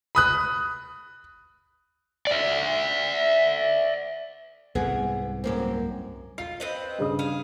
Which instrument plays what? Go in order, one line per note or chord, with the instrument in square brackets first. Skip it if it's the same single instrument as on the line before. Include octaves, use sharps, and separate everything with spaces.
[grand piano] B5 D#6 F#6
[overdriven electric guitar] D5 E5
[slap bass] C2 G#2 C3 [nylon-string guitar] B3 G#4
[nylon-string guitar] F#2 A#3 C4
[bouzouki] F4 [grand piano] C7
[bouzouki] C4 B4 D#5
[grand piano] G2 C#3 D#6
[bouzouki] G#4 F5